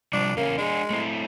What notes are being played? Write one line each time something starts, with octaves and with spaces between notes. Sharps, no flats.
C3 F3 G3 D4
E2 C#3 A#3 C#4
G#3 D4 G#4
A3 C4 E4